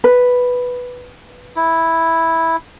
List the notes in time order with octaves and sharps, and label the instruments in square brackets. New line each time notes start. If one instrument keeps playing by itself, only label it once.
[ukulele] B4
[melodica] E4